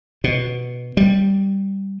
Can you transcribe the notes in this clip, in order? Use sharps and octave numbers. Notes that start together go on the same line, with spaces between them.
B2
G3